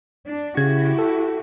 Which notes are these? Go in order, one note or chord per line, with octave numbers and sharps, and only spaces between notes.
D4
C#3 E4 F#4 G4 G#6
A4